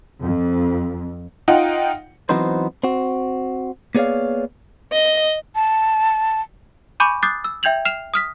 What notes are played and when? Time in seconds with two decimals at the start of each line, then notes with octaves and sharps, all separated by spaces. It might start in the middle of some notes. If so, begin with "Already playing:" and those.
0.21 F2
1.48 D#4 F4 F#5 G5
2.29 E3 F#3 B3 C4 D#4 C5
2.84 C4 F#4
3.95 A#3 B3 G#4 C#5 D5 F5
4.92 D#5
5.55 A5
7.00 G#5 B5 C#6 D6 G6 D#7
7.23 D6 D#6 F#6 G6 A6 C7
7.44 E6
7.63 E5 G5 G6 G#6 F7 F#7
7.85 F6 C7 E7 F7
8.14 D#6 F6 B6